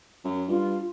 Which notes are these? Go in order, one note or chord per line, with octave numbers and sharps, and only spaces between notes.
F#2
G2 F4